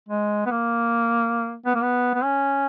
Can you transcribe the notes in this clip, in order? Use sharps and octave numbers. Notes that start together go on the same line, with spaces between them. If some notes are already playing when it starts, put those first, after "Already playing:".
G#3
B3
A#3
B3
A#3
B3
B3
C#4